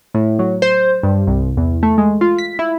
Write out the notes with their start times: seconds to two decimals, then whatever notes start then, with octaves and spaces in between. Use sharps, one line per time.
0.14 A2
0.39 F#3
0.62 C5
1.03 G2
1.27 C2
1.57 E2
1.83 A3
1.98 G#3
2.21 F4
2.38 B6
2.59 E4